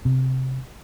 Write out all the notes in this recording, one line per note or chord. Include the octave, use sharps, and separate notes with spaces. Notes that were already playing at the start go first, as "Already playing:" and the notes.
C3